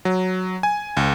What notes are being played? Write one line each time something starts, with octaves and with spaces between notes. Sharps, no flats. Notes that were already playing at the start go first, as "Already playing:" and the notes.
F#3
G#5
C#2